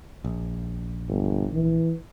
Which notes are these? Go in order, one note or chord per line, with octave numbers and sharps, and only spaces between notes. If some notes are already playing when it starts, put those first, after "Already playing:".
A#1
G1
E3